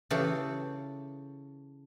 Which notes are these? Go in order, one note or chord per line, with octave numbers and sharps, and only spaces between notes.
C#3 E3 G4 A4